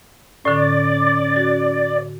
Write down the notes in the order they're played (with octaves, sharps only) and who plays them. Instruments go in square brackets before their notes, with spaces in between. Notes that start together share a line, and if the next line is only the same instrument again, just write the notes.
[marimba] A2 D3 [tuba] C#4 [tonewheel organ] D5
[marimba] F#4